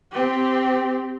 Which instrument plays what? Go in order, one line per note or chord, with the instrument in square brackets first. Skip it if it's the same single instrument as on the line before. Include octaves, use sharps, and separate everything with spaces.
[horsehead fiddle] C4 G4